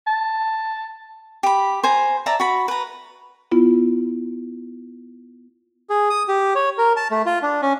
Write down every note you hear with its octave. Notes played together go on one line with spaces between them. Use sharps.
A5
G4 B5
C5 G#5 A#5
D5 E5 A5 A#5
F#4 B5
B4 A#5
B3 E4 F4
G#4
D#6
G4
C#5
A#4
A5
A3
F4
D4
C#4